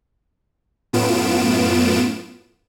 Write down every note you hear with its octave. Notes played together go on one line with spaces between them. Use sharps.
F#2 A2 B3 F4 D7 E7